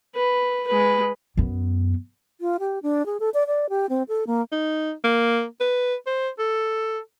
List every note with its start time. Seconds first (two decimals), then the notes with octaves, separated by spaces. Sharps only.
0.15 B4
0.68 G#3 B4
1.37 F#2 B3
2.41 F4
2.60 G4
2.83 D4
3.06 G#4
3.20 A4
3.34 D5
3.47 D5
3.69 G4
3.89 C4
4.09 A4
4.27 A#3
4.52 D#4
5.04 A#3
5.60 B4
6.07 C5
6.39 A4